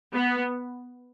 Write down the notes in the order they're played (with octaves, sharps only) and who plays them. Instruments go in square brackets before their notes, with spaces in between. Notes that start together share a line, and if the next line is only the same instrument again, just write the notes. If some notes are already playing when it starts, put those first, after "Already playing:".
[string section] B3